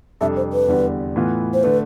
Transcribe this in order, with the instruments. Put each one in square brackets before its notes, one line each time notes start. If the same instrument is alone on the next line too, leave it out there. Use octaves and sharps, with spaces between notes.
[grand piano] F2 C3 G3 D4 A4 [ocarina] E5
[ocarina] C5
B4
[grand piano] E2 D3 G3
A2 E3 B3 F4
[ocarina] C5
[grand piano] D3 A3 [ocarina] B4